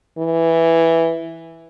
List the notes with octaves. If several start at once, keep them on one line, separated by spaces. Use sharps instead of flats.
E3